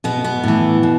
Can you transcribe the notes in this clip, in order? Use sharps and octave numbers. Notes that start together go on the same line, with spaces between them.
B2 B3
B3
A2 E3
B2